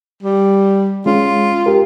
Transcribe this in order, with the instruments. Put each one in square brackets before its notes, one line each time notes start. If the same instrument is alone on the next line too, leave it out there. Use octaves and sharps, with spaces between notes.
[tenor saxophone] G3
[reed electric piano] G#3 C#4 [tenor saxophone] F4
[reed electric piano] G4 A#4